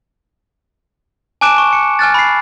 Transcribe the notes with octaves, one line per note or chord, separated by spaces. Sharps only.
G#5 A5 D6 F#6 D7 E7
C#6
C#7
G#5 F6 F#6 A6
B5 C7